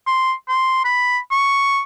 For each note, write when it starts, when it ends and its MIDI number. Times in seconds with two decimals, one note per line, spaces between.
0.07 0.33 84
0.49 0.80 84
0.85 1.18 83
1.31 1.80 85